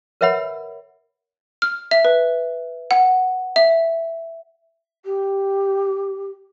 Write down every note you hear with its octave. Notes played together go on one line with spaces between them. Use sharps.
A#4 B4 C#5 E5 F#5 B5
F6
E5
B4
F#5
E5
G4